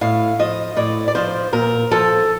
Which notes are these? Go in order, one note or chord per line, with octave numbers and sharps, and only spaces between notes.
A2 F5
F3 D#5
A2 D5
D5
F3 C5
A#2 A#4
F3 A4